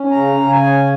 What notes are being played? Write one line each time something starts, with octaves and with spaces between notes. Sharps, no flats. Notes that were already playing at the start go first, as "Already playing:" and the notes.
Already playing: C#4
C#3 A#5
C#3
G#5
C#4